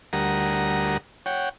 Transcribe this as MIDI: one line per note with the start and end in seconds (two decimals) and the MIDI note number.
0.13 0.97 38
0.13 0.97 55
0.13 0.97 70
0.13 0.97 78
0.13 0.97 82
0.13 0.97 87
1.26 1.49 73
1.26 1.49 78
1.26 1.49 79